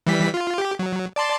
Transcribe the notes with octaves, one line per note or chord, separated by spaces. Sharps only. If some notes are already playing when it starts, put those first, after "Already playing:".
E3 G3 B6
F4
G4
F#3
D5 A5 C6